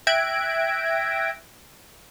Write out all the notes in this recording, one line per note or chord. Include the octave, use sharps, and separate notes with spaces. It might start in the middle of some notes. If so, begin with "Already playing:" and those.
E5 G5 F#6 G#6 A#6 D7